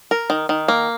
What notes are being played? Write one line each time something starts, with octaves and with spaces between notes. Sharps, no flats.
A#4
D#3
D#3
A#3